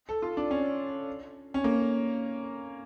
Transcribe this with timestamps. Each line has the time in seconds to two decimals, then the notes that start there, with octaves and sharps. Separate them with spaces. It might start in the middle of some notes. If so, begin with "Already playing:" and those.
0.09 A4
0.22 F4
0.37 D4
0.51 C#4
1.54 C#4
1.64 A#3